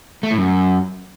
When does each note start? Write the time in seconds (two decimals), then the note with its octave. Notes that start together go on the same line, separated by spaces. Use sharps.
0.23 A3
0.30 A2
0.38 F#2